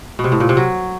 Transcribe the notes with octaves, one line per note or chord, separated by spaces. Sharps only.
B2
C3
A2
A#2
C3
F#3